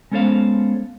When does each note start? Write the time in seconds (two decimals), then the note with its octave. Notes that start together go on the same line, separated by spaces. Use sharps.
0.11 G#3 B3 C#4 A4 C5 F5